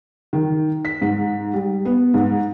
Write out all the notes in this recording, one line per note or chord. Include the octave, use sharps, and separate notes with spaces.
D#3
B6
G#2
G3
B3
G#2